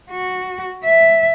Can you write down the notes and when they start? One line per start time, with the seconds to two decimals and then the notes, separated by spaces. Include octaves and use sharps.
0.10 F#4
0.84 E5